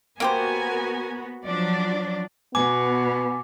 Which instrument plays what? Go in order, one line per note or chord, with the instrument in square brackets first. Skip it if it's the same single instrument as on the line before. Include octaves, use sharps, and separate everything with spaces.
[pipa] A#3 G4 C5 [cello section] B3 F#4 [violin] A#4 G#5
[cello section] F3 F#3 D4 [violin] D5
[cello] B2 [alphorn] B3 [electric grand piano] G#5 [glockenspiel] D6